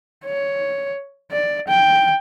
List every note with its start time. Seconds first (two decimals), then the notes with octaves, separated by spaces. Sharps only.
0.25 C#5
1.32 D5
1.68 G5